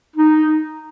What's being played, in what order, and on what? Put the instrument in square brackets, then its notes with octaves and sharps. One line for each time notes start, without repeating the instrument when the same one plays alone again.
[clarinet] D#4